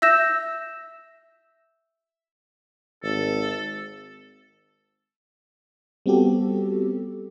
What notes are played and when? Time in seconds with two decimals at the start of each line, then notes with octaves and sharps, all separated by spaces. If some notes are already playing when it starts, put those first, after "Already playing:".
0.02 E5 E6 G6 A#6 E7
3.03 G#1 A4
6.06 G3 B3 C4 F#4 G4 A4